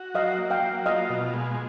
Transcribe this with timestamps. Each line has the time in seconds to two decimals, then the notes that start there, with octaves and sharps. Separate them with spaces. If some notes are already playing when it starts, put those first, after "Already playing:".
Already playing: F#4
0.14 F#3 D#5 F5
0.38 A#3
0.51 F5 G5
0.63 F#3
0.86 F4 D#5 F5
1.10 B2
1.34 G#3